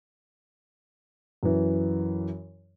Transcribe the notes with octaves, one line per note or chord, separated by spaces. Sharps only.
F#2 E3